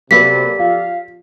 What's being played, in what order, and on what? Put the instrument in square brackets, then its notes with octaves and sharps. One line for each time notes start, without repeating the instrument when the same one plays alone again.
[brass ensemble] C3 [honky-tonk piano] F#3 A#3 B4 [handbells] G4 A4 D5 [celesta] B6
[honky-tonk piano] F3 [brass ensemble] F5